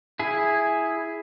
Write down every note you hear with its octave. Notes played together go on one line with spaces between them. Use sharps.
E4 G#4